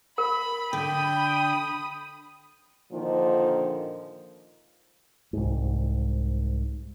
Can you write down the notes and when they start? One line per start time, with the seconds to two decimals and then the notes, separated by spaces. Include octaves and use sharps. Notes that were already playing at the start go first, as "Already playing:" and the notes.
0.18 A#4 B5
0.73 D3 G5 B5 D#6
2.92 A#2 D3 D#3 F3
5.33 C2 G#2